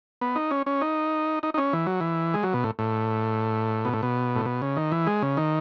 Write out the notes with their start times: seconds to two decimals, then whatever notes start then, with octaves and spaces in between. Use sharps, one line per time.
0.21 B3
0.36 D#4
0.51 C#4
0.66 C#4
0.81 D#4
1.43 D#4
1.54 D#4
1.58 C#4
1.73 E3
1.86 F#3
2.01 E3
2.34 G#3
2.43 F#3
2.53 B2
2.64 A2
2.79 A2
3.85 B2
3.93 A2
4.03 B2
4.36 A2
4.46 B2
4.62 C#3
4.77 D#3
4.92 E3
5.07 G#3
5.22 C#3
5.37 D#3